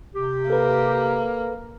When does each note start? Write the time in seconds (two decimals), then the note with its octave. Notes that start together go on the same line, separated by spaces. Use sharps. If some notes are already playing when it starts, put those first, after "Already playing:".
0.14 C3 G4
0.50 A#3 A4 B4